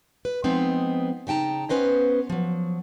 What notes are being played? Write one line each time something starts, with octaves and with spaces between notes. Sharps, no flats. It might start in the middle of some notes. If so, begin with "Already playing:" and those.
B4
F3 G#3 B3 C4 D#4
C#3 D#4 G5 A5 A#5
B3 C#4 B4 C5 D#5
F3 F#3